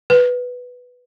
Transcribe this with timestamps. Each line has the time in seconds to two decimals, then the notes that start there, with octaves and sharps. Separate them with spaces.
0.10 B4